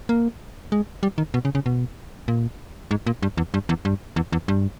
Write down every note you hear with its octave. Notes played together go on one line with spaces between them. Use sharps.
A#3
G#3
G3
D#3
B2
C#3
C#3
B2
A#2
G#2
A#2
G2
E2
G2
E2
G2
E2
E2
G2